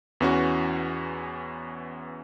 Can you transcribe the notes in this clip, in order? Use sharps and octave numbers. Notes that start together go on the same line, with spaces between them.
E2 E3 C#4 F#4